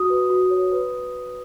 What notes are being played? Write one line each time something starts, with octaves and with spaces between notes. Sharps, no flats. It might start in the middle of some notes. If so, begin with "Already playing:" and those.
Already playing: F#4 D#6
B4
F#4
C#5
B4